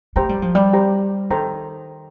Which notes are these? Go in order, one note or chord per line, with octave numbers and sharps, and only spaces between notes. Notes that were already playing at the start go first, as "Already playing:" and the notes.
A3 G4 C5 G5 A#5
G3
F3
G3
G4 C5 G5 A#5
D#3 A4 C5 G5 A#5